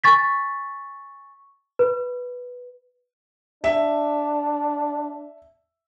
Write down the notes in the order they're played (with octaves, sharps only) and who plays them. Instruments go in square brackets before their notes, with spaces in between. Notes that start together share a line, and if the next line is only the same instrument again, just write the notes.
[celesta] G#5 C#6 A6 B6
B4
[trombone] D4 [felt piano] E5